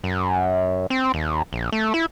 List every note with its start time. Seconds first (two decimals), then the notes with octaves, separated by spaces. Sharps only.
0.04 F#2
0.90 C4
1.14 D#2
1.53 A#1
1.72 A3
1.94 E4